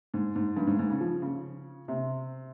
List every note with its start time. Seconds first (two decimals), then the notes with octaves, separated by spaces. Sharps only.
0.14 G#2
0.35 G#2
0.57 G2
0.67 G#2
0.79 G#2
0.90 C#3
1.01 F3
1.22 C#3
1.88 C3